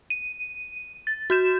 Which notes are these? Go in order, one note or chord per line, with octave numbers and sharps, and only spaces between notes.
D#7
A6
F#4 G6 E7